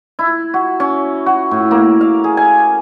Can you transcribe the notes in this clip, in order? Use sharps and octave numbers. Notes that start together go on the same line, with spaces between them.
E4
F#4
C#4
F#4
A2
A#3
F5
G#4
G#5